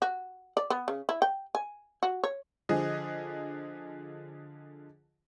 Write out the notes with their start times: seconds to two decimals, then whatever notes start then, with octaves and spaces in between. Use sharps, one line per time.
0.02 F#4
0.57 D5
0.70 B3
0.88 C#3
1.09 E4
1.22 G5
1.55 G#5
2.03 F#4
2.24 C#5
2.69 D3 F3 G#4 D#5